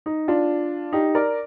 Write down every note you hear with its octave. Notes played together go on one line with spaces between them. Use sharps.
D#4
D4 F4
D#4 G4
A#4 D5